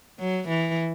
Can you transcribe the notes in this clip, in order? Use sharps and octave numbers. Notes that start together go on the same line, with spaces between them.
F#3
E3